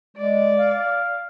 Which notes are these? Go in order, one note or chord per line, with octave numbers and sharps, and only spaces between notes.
G#3 D5
F5